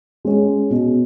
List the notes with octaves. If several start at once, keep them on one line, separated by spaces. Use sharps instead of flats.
G#3 C#4
B2